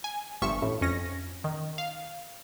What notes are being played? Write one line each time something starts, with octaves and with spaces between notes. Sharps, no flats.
G#5
G1 G2 F3 E5 C#6
A1 A2
F2 C#4 A#6
D#3
F5